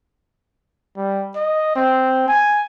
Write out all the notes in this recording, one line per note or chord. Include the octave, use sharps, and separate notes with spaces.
G3
D#5
C4
G#5